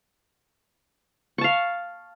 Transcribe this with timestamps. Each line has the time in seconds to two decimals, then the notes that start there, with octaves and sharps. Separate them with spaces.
1.38 C#6
1.41 A5
1.44 F5